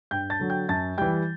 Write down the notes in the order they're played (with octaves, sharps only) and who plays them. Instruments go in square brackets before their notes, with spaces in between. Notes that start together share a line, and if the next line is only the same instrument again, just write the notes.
[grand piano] G2 G5 G6
A5 A6
D3 F#3
G5 G6
F#2 A5 A6
E3 G3 G5 G6